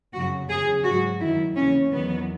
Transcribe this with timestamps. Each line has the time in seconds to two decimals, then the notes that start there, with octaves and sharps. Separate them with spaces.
0.13 F#2 C#3 F#3 F#4
0.49 E2 C#3 F#3 G#4
0.84 G#2 F#3 F#4
1.19 F#2 D#3 F#3 E4
1.56 D#2 C#3 E3 C#4
1.91 E2 D#3 F#3 B3